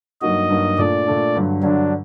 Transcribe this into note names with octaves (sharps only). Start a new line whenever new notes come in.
G2 F#3 A#3 D#4 F#4 D#5
G2 F#3 A#3 D#4 F#4
A#2 A3 D4 D5
A#2 A3 D4
G2 D3 F#3
G2 D3 F#3 D4